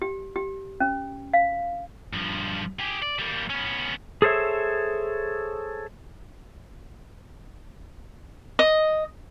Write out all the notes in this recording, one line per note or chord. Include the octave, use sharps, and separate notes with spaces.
G4
G4
C#4
F5
G2 F3
G4 G#4
D5
G3 A#3
B3 C#4
G#4 A4 C5 C#5 E5
D#5